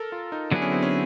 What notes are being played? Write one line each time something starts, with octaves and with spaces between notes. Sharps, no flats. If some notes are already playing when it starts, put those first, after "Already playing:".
Already playing: A4 A#4
F4
D#4
D3 F#3 B3 D4 E4 G#4
C#4
C4
C#4